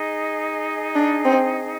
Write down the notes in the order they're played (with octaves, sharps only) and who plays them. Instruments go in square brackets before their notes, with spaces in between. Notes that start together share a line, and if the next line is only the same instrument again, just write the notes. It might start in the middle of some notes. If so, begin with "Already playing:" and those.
Already playing: [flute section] D#4 G#4 D#5
[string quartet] D4
C4